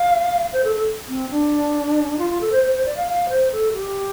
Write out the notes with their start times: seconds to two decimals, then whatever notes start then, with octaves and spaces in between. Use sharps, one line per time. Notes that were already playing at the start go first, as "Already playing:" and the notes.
Already playing: F5
0.53 C5
0.64 A4
0.75 A4
1.08 C4
1.30 D4
2.19 F4
2.30 F4
2.41 A4
2.52 C5
2.63 C5
2.75 C5
2.85 D5
2.97 F5
3.07 F5
3.29 C5
3.52 A4
3.74 G4